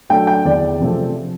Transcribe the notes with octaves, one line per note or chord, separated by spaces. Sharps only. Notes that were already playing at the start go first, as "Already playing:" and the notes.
F#3 A3 D4 G5
G5
E2 D5
C3 F3 A3 C4